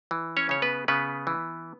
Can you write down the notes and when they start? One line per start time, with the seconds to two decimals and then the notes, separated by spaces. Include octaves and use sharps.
0.11 E3
0.37 C#4 C#5
0.49 C#3 C#5
0.62 B3 B4
0.88 C#3 B3 B4
1.27 E3